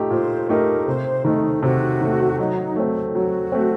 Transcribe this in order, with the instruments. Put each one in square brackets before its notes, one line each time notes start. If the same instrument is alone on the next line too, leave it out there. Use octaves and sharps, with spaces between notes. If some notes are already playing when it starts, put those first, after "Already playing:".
Already playing: [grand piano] A#2 A3 D#4 G4
[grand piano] A#2 [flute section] C5
[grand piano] A3 D#4 G4 [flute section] A#4
[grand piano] C3 [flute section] C5
[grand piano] D#3 A3 [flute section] D#4
[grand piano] C3 [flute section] F#4
[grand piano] D#3 A3
[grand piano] F#3 [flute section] D#4
[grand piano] A3 C4
[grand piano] F#3 [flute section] F#4
[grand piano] A3 C4